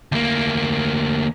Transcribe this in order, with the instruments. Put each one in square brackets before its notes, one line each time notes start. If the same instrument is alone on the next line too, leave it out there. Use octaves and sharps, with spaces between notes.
[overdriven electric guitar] D2 A#3